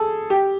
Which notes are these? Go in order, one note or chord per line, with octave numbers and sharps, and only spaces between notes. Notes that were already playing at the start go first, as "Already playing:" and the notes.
Already playing: G#4 A4
G4